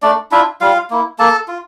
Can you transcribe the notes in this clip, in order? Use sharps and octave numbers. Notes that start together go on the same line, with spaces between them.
A3 D4 D5
D4 E4 F4 E5
G3 F4 F5
A#3 E4
A#3 A4 A5
F4